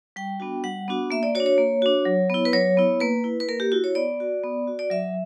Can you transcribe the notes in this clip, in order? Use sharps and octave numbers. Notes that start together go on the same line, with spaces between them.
G3 G5
B3 D4 F#4
G3 F#5
B3 D4 F#4
A#3 E5
D5
D4 F#4 C#5
C#5
A#3
D4 F#4
F#3
B3 E4
B4
F#3 C#5
B3 E4
A#3 B4
E4
B4
A#3 A#4
G4
E4 F#4
C#5
B3 D5
F#4
B3
F#4
D5
F#3 E5